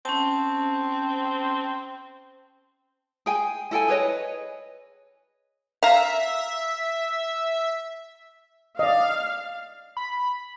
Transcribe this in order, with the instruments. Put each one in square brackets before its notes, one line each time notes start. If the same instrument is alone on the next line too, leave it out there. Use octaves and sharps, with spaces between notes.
[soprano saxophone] C4 [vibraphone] C#4 A5
[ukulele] G#4 G5 G#5
E4 A4 G5 G#5
G#4 B4 C#5 D#5
[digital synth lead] E5 [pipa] F5 A#5
[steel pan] D5 D#5 [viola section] F5
[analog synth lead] B5